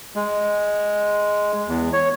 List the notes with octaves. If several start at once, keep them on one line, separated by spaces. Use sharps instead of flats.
G#3
E2
C#5